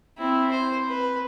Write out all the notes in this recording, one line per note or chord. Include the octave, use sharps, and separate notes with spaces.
C4 E4
C5
B4